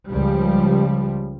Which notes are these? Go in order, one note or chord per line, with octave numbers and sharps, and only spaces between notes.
C#2 F3 G3